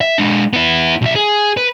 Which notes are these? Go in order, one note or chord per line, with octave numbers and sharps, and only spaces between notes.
E5
G#3 D4
B3 E4
B1 E5
G#4
B4